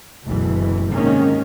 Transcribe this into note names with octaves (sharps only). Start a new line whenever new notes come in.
F#1 D2 B2 E3
G#2 C3 D#3 A#3 C#4